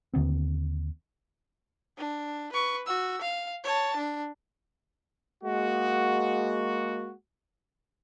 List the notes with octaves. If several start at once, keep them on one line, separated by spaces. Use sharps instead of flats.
D#2 D3 B3 C4
D4
B4 C#6
F#4 E6
F5
C#5 A5
D4
G#3 A#3 F#4